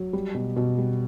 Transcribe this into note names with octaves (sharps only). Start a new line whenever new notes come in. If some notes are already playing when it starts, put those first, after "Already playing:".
Already playing: F#3
G3
B2
B2
G3